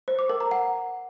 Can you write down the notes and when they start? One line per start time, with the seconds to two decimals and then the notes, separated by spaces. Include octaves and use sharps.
0.08 C5
0.19 D6
0.30 A#4
0.40 A#5
0.51 F#5